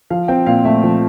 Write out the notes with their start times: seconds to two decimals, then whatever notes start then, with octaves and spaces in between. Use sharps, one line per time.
0.10 F3 F5
0.28 C4 G5
0.46 A#2 F5
0.65 A3 E5
0.84 F3